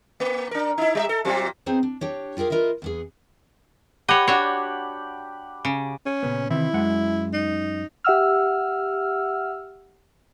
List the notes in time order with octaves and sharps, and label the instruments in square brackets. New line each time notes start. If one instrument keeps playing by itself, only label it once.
[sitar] A#3
D4 A#4
D#4 E4
G3 D#5 E5
A4
A#2 F#3 C4
[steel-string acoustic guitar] B3 C4 D#4 G#4 C5
D4
D4 G4 C#5
F4 G4 G#4 A#4 F5
F4 A#4 B4 D#5 E5
E2 B3 G#4
[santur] G4 F#5 B5 [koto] C#5 D#5
[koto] D4 F#4 C#5
C#3
[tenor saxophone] C#4
[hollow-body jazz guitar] A#2 C#3 B3
[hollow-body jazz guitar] C3 D#3 E3 [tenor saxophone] E4
[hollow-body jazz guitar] F#2 G#3 F#5
[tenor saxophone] D#4
[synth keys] G4 E5 F#5 E6 F6